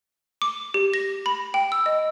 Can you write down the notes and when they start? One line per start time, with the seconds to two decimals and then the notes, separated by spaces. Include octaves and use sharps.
0.42 D6
0.74 G4
0.94 A#6
1.26 B5
1.54 G5
1.72 E6
1.86 D#5